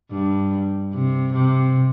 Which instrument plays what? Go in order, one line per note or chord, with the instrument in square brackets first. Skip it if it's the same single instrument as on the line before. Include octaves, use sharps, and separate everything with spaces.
[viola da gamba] G2
C3
C3